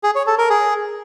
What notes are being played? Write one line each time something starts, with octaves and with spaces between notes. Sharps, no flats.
G#4
C#5
A4
A#4
G#4